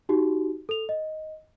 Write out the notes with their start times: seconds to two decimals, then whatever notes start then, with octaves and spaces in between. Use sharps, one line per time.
0.09 D#4 F#4 G4
0.69 A4 F7
0.89 D#5